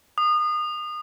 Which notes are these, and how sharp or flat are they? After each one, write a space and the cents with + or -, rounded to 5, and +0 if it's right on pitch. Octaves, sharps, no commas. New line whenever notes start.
D#6 -30